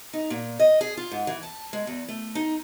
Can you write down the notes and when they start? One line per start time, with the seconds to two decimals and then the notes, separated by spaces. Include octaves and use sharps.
0.13 D#4
0.30 A#2
0.59 D#5
0.81 G#4
0.97 F4
1.11 G#2
1.27 E3
1.43 A5
1.73 G#3
1.87 E2
2.08 A3
2.35 D#4